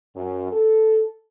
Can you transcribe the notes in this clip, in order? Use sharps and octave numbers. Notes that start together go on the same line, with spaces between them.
F#2
A4